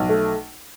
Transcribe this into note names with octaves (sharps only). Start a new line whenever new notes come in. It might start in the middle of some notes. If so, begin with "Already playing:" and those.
Already playing: B1
A3